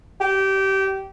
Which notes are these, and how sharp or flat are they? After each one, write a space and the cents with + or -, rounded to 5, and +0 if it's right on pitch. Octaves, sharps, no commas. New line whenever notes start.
G4 -20